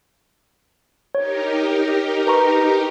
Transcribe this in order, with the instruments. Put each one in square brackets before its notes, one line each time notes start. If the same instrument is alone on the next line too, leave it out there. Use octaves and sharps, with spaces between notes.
[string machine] D#4 G4 A#4 [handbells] C#5
[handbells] B4 A#5 C#6